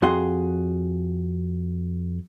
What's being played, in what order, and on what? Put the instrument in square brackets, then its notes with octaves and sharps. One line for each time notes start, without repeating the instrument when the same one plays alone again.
[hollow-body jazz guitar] F2 F#4 G#4 F#5 C6